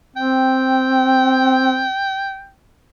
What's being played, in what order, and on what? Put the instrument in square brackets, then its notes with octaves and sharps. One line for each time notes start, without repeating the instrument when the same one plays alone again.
[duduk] C4 [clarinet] G5